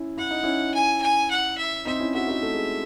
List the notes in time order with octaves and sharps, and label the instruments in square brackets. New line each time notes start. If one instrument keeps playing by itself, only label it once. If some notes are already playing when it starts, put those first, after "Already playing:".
Already playing: [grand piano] C#4 E4
[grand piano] E4 [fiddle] F#5
[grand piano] D#4
C#4 E4
[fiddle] G#5
G#5
F#5
E5
[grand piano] C4 D#4 [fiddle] E5
[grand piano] C#4 E4
[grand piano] D#4 F#4 [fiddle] E5
[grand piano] D#4 F#4
A3
G#3